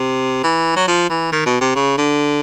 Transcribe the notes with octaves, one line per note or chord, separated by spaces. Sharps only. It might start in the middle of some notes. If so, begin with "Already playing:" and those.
Already playing: C3
E3
F#3
F3
E3
D#3
B2
C3
C#3
D3